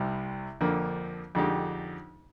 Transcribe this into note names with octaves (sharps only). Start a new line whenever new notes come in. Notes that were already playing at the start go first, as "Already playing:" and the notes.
Already playing: C2 C3 G3
F2 D3 F3 A#3
F2 D3 G#3 D#4 G4